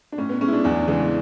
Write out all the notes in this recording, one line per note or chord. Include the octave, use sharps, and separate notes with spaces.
D4
A2 C#4
B3
G#3 C#4
E4
D4
E2 D4
C#3 E3 G#3